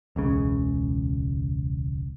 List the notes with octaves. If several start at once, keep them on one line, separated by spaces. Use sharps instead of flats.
E1 C#2 C#3